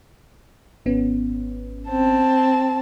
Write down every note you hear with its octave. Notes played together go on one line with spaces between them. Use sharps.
G#1 B3 C#4
C4 A5